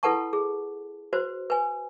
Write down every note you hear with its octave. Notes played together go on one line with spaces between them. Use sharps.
E4 A4 B4 F#5 A5 C#6
G#4
F#4 B4 C5
B4 G#5